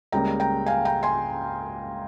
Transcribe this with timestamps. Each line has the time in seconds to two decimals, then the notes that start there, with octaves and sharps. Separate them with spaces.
0.12 C#2 C#3 G3 A#3 G5 A#5
0.40 G5 A#5
0.66 F5 G#5
0.85 G5 A#5
1.03 G#5 C6